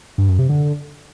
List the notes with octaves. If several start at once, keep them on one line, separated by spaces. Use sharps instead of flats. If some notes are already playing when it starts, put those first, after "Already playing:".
G2
F#2
C3
D3